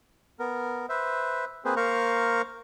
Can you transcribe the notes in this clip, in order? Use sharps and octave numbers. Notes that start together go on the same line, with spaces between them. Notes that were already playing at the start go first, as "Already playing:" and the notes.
B3 A#4
B4 C5 E5
A#3 C4 G#4 B4 C5
A#3 A#4 C5 F5 A#5 C#6